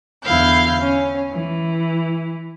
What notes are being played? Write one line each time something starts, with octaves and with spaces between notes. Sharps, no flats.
E2 D3 E4 F5 G6
C#4
E3